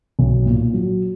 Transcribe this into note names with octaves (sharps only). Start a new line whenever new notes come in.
B1
A#2
F#3